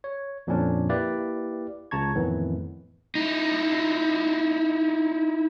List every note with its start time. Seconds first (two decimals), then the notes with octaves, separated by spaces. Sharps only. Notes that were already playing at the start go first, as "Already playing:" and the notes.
0.04 C#5
0.47 F2 A#2 D3 F3 C#4 D4
0.89 A#3 E4 G4 B4 D5 F5
1.91 C#2 C#3 A5 A#5 C#6 G#6
2.15 F2 A2 D#3 E3 B3
3.15 D#4 E4